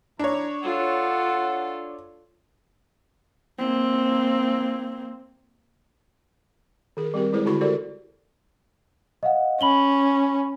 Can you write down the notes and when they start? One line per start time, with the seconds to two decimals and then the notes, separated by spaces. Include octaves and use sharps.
0.19 E3 D4 E4 C#5 A#5
0.63 F4 A4 F#5
3.59 A#3 C4
6.97 D#3 G#4 A#4
7.14 G3 C4 G4 A#4
7.33 G#3 E4 G#4 B4 C5
7.46 D3 E4 F#4 B5 C#6
7.61 F#4 G4 A4 A#4 C5 D5
9.23 D#5 F5 F#5
9.61 C#4 B5 F#7 G7